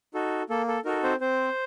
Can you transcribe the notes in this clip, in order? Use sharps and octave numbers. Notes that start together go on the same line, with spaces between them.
D#4 F#4 A4
A#3 A4
A4
D#4 F#4 A4 A#4
C4 C5
C4 C5